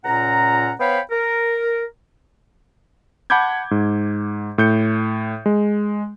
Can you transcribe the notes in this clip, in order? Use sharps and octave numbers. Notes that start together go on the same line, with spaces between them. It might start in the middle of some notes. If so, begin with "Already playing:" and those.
C#2 A#2 C#4 F#5 A#5
B3 C5 C#5 F5 G5 B5
A#4
F#5 A5 B5 D6 G6 G#6
G#2
A2 G6 C#7
G#3